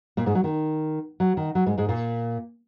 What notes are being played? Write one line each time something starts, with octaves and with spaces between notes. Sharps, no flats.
A#2 A#3
G#2 G#3
F#3
D#3
F#3
D#3
F#3
G#2 G#3
G#2 G#3
A#2 A#3